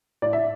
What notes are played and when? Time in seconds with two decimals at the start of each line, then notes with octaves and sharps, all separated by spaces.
0.22 A2 D5
0.33 E5